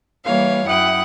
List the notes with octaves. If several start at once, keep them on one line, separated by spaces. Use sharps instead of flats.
E3 G3 A#3 C#5 F5
F#2 E4 F#5 G5 D#6 F#6